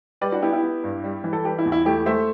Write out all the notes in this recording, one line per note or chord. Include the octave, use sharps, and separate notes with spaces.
G3 B4 D5
D4 F#4
B3 E4 G4
E4 G4
B3
G2
G3
E3
A4
G3 G4 B4
E4
E2
E4
A3 E4 G4
A3 C5 E5